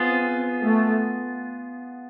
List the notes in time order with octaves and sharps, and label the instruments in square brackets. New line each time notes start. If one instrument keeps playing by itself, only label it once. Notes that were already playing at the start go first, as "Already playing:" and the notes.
Already playing: [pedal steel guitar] B3 F4 G#4 [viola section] C4
[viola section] A3